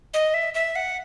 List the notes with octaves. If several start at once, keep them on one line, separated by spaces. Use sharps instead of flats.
D#5
E5
E5
F#5